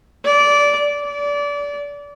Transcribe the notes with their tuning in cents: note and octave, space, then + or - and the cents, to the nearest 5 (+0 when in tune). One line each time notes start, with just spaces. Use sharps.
D5 -15
D5 -25